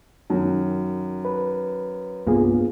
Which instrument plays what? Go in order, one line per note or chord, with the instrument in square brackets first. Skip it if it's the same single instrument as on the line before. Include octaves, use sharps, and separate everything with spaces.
[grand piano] F#2 D#3
[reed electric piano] B4
[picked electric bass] C2 G2 A#3 [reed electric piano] B3 F4 G#4